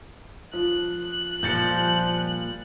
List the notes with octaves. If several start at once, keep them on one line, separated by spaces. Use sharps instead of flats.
F3 F#6
A#2 F3 G3 G6 A6 C#7